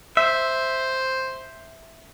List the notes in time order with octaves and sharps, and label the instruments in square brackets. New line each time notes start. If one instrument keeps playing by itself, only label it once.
[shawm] C5 [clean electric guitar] E5